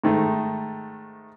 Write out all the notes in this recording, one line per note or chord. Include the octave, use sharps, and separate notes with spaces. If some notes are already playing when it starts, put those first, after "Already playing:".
G#2 D#3 A3